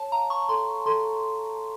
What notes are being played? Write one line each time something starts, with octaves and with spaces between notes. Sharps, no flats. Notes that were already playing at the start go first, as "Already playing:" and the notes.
Already playing: C#5 A5
F5 A#5
C#6
A4 C6
A4 C6